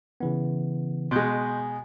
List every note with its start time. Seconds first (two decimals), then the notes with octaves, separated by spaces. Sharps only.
0.20 C#3 E3 B3
1.11 B2 G#3 C6 F#6 G6